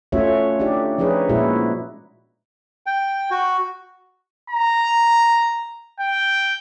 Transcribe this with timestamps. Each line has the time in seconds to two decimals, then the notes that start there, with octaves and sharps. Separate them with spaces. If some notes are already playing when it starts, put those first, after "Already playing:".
0.12 A3 C#4 F4 F#4 C#5 E5
0.60 D4 D#4 G4 D5
0.98 F3 C#4 D#4 G#4 B4 C#5
1.29 A#2 G#3 E4 F#4
2.86 G5
3.31 F#4
4.50 A#5
6.00 G5